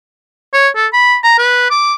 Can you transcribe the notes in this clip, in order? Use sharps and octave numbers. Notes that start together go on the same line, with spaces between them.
C#5
A4
B5
A#5
B4
D6